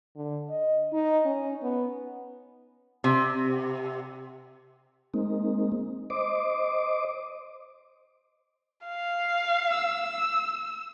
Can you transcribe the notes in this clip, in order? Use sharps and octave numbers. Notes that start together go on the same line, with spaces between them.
D3
D#5
D#4
C#4
B3
C3
G#3 A#3 C4 D#4
C5 D#5 D6
F5
E6